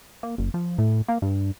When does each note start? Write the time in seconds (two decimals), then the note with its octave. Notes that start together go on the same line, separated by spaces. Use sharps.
0.23 A#3
0.38 F#1
0.54 F3
0.78 A2
1.08 A#3
1.22 G2